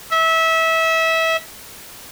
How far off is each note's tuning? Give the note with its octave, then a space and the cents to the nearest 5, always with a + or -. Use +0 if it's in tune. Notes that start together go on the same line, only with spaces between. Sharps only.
E5 -25